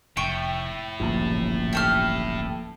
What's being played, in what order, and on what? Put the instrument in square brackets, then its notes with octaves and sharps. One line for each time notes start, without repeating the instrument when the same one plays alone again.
[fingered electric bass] F1 [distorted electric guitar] A2 [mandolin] G5 C#6
[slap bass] D1 A1 G2 [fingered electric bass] A#2 F3
[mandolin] G4 A4 F6